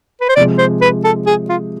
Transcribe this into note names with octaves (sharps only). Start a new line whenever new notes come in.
B4
C5
C3 F3 G#3 D5
C5
B4
A4
G#4
F4